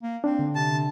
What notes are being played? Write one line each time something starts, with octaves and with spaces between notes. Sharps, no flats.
A#3
C4 D4
D3
C3 A5